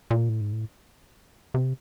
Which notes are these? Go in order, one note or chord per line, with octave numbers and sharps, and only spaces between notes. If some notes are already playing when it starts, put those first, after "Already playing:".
A#2
A2
G#2
A2
C3